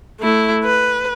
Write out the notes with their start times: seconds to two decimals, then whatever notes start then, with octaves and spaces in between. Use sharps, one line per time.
0.20 A3 E4
0.64 B4